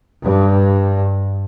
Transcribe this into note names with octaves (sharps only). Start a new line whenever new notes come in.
G2